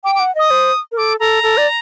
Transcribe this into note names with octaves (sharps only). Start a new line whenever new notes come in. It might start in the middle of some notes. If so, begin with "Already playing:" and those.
G5 D6
D6
F#5
D#5 D#6
C5
A#4
A4 D6
A4 A#5
A4
D5